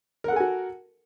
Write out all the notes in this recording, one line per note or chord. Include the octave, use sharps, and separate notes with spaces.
F#4 A4 A#4 F#5 G#5